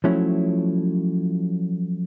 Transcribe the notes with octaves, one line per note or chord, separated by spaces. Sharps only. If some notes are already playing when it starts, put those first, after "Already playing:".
F3 F#3 A3 C#4 E4